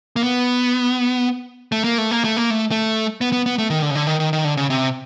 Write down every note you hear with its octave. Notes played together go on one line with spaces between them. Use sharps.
A#3
B3
A3
A#3
A3
A#3
A3
A#3
A3
A3
B3
B3
B3
A3
D#3
D3
C#3
D3
D#3
D#3
D#3
D3
C#3
C3